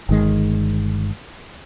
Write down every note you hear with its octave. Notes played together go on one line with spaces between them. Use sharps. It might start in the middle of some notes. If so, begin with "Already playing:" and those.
G1 D#3 G#3